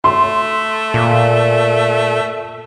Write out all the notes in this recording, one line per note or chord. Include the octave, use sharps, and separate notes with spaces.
A3 C6
A#2